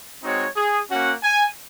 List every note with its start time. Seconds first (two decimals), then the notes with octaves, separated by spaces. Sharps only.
0.24 G#3 C4 D#4 F#4 C#5
0.57 G#4
0.90 A#3 C#4 F#4 F#5
1.24 G#5